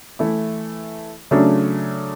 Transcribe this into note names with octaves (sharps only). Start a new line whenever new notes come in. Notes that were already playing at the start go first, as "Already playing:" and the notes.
E3 A3 E4
C#3 F#3 A3 D4